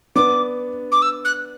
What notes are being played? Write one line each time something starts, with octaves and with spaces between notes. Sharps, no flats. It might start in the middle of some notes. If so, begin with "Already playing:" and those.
B3 D4 D6
D6
E6
F#6